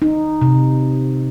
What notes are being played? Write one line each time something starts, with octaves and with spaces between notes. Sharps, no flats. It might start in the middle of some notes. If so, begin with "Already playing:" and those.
D#4
C3